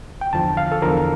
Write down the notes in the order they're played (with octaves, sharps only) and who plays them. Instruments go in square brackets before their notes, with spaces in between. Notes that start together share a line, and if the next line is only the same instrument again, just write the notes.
[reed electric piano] G5
E2 D3 F3 A5
F5
A4
E2 D3 F3 A#4